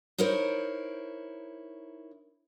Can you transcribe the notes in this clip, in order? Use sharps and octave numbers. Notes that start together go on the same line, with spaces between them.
D#4 E4 A#4 C5 C#5